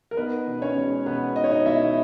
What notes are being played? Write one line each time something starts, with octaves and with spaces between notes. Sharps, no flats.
A#4
B3 D#4 B4
B2
C#4 C#5
G#3
B2 B3 B4
D#4 D#5
C#5
D#4 D#5
B2 E4 E5